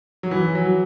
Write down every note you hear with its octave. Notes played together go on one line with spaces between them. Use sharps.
F#3
E3
F#3